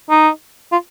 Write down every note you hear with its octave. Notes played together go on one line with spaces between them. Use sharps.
D#4
F4